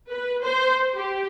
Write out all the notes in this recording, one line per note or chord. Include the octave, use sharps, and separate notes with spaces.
B4
C5
G4